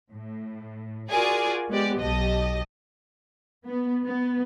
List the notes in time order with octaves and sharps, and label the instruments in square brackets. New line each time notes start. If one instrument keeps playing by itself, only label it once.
[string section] A2
F4 F#4 G#4 A#4 D5 G#5
G#3 B3 G4 D5
B1 G4 D#5 A5
[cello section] B3
B3